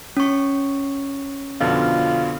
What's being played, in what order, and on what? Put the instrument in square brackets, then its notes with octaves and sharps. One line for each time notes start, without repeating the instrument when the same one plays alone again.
[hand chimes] C#4 C#6
[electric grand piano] F2 B2 D3 [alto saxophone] F4